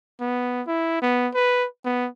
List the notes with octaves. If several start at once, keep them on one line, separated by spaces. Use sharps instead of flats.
B3
E4
B3
B4
B3